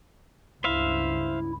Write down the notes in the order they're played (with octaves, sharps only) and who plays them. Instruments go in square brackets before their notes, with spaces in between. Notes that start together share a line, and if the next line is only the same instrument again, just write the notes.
[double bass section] C#2 G2 [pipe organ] E4 [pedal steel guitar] C5 E5 F5